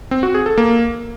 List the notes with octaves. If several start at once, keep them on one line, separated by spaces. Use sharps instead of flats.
C4
F#4
G#4
A4
A#3